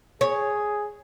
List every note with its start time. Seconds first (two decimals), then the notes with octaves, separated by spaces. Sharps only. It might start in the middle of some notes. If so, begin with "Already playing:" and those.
0.21 G#4 C#5